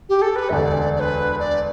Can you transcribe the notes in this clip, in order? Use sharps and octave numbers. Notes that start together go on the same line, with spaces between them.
G4
A4
B4
E1 D2 D3 D5 E5
D5
B4
D5